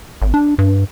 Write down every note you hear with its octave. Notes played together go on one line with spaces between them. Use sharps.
G#1
D4
G2